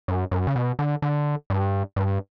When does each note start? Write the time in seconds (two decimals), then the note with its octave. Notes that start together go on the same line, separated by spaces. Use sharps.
0.08 F#2
0.31 F#2
0.47 C#3
0.56 B2
0.79 D3
1.02 D3
1.50 G2
1.96 G2